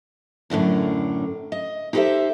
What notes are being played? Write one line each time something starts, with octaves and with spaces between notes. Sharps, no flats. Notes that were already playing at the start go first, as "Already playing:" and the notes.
F#2 A2 D3 A#4
D#5
D#4 G4 A4 B4 C5 E5